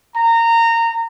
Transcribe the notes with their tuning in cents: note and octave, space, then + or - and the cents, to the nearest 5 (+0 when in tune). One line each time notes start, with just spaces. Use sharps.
A#5 -20